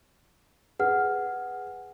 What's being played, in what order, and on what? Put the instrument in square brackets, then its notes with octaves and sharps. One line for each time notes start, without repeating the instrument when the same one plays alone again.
[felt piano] G#4 [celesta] B4 F#5 F6